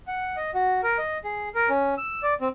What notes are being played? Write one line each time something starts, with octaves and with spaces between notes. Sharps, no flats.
F#5
D#5
F#4
A#4
D#5
G#4
A#4
C#4
E6
D5
C4